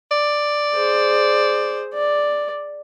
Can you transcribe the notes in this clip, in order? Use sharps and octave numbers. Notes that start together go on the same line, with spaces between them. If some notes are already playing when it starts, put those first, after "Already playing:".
D5
G#4 C5
D5